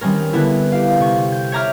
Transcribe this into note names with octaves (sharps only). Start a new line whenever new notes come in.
D#3 G3 C4 C#4 A#4
D3 B3 D4 E4
G4 F5
C3 C#6
G6
C#5 E5 A#5 D6 F6 G6